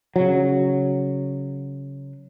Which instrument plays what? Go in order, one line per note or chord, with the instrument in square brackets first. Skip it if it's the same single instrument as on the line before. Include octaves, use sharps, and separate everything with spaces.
[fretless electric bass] C#3 F#3